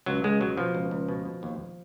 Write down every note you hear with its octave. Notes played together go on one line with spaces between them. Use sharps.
C#2 F#3
C#2 G#3
B2 F#3
B2 F3
C#2
C#2
B2
B2
D#2